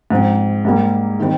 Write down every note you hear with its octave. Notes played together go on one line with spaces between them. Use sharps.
G#2 F3 C4
G#2 G3 A#3
D#3 G3 C4